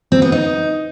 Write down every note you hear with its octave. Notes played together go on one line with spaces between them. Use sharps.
C4
B3
D#4